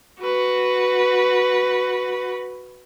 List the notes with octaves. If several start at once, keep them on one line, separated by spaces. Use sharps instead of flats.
F#4 B4